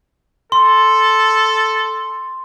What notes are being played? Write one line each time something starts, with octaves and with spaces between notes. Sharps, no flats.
A4 C6